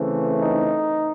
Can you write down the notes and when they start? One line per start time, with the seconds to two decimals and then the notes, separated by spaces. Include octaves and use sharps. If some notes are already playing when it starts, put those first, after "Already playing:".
Already playing: C#3 E3 A3 C4
0.40 D#4